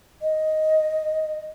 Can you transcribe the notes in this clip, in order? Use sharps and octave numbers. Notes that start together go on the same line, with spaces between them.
D#5